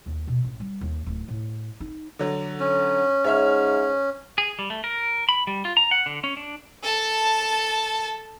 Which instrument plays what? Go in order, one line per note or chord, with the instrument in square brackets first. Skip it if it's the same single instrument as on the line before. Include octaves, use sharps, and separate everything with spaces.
[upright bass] D#2
B2
A1
G3
D#2
D1
A2
D#4
[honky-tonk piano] D3 F#3
[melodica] C#4
[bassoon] G#2 [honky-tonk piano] C#5 E5 F6
[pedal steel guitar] G#4
G3
A3
A#4
B5
G3
F4
A#5
F#5
D3
C#4
D4
[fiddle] A4 A5